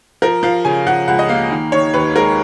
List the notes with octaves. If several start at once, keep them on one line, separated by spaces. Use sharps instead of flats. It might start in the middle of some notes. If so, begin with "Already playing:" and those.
F3 A#4
F3 F5
C#3 G#5
F3 F#5
C#2 F#5
D#5
A#3 F5
D#3
D#3 C#5
D#2 B4
G#3 A#4